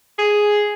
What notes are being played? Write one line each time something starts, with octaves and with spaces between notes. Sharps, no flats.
G#4